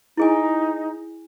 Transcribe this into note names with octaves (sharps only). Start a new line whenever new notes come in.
D#4 E4 G#4 G#5